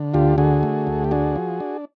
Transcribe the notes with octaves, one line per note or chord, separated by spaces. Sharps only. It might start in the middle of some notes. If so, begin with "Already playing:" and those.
Already playing: D3
D2 F4 G4
D3 F#4 G#4
A3
D2
G4
D4 F#4 G#4
F3
D4